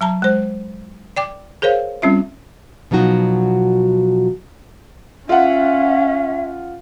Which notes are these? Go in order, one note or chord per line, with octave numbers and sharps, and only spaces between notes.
F#3 A5 A#5
G#3 C5
D5 G5 D6
G#4 A#4 C5 C#5 F5
G3 C4 C#4 F4 E5
B2 F3 F#3 D#4 F#4
C#4 F4 E5 F#5